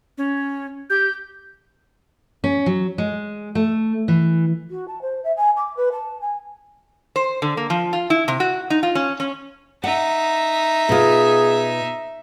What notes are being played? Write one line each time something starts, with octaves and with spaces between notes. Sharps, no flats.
C#4
G4 G6
C#4
F#3
G#3
A3
E3
F#4
A5
C5
E5
G#5
D6
B4
A5
G#5
C5
D3
A#3
F3
F4
E4
C3
F#4
D#4
F4
C#4
C#4
D#4 E5 F#5
B2 F4 G#4